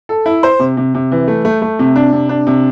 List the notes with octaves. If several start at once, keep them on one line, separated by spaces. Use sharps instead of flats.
A4
E4
C5
C3
C3
C3
E3
A3
A3
A3
C3
D4
C3
D4
C3